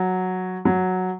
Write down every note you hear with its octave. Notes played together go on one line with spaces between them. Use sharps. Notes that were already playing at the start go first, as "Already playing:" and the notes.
Already playing: F#3
F#3